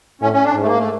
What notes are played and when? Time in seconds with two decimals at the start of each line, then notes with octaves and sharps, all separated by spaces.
0.21 A2 C#4
0.33 C#4
0.44 D4
0.55 G#2
0.62 A3
0.67 A#3
0.78 A3